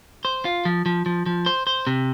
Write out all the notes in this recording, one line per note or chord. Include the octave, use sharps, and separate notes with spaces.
C5
F4
F3
F3
F3
F3
C5
C5
C3